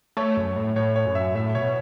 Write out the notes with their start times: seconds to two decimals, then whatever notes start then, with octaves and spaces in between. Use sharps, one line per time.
0.17 A3 C#5 C#6
0.37 F#2
0.56 A2
0.76 A2 C#5
0.96 C#5
1.06 F#2
1.15 E5
1.35 A2 E5
1.55 B2 C#5